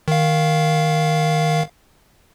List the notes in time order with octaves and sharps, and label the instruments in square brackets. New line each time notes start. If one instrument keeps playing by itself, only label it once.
[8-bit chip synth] D#3 F5